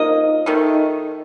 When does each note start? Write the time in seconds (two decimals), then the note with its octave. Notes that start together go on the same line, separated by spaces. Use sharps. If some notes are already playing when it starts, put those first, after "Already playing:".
Already playing: F3 A#3 D#4 D#5
0.46 D#3 A3 D#4